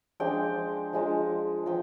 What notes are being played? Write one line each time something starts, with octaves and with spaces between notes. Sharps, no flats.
F3 G#3 D4 F4 G5
F3 G#3 D4 F4
F3 G5